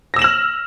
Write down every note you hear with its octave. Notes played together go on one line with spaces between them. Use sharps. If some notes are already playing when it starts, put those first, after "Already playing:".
E6 F6 A#6 E7 F#7